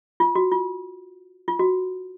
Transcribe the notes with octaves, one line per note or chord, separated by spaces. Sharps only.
F4
F#4
F4
F4
F#4